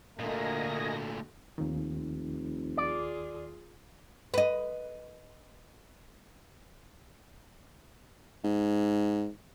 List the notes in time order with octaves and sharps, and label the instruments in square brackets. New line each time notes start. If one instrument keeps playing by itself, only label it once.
[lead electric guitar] A#2 A3 [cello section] D3 F#4 [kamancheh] A#3 [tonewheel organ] D#5 G#5 A#6
[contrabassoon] F1 [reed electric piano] D#2 D#3
[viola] F4 G#4 [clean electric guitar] D5
[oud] B4 D#5
[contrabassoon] G#2